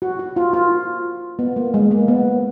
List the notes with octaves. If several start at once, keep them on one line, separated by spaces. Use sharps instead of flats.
F#4
F#4
F4
F4
B3
A#3
G#3
A#3
B3